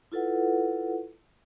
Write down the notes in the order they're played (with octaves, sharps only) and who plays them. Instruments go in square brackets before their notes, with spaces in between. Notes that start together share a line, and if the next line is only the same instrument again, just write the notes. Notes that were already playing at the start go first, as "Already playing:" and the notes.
[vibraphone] E4 F4 A4 B4 F#5